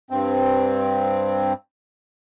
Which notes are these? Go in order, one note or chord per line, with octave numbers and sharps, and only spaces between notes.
G2 C4